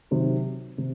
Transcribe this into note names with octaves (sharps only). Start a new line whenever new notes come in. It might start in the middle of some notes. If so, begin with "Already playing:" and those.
C3 D#3 F#3
C3